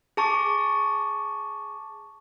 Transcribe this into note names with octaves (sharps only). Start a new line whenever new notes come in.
G#4 A5 C#6 D6